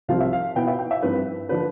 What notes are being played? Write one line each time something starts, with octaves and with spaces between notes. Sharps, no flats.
C2 C3 F3 C4 F4 F5
E5
F5
B2 B3 E4 G5
E5
G5
E5
G2 F3 C4 E4 B4
D3 F3 B4